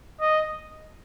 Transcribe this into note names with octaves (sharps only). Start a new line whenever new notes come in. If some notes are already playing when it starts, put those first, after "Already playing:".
D#5